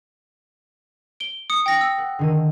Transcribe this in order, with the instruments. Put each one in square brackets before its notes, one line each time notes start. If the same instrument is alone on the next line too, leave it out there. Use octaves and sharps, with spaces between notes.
[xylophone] D7 G7
D#6 C#7
G5 A#6 C#7
E6
[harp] F#5
D3 D#3 D#7